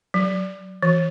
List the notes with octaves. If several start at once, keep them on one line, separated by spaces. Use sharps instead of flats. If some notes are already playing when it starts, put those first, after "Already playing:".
F#3
E3